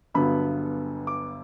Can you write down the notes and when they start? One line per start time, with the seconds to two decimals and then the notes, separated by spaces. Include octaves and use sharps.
0.14 G1 G2 D3 F#3 B3 B5
1.07 D6